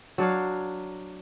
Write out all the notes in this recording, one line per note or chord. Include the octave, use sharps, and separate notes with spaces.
F#3 D4 C#5 F5